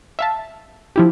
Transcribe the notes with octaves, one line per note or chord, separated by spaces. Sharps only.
E5 F5 A5
F3 E4 G4